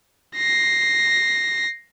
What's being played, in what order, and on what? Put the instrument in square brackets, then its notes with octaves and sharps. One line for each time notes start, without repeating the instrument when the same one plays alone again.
[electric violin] A#6 C7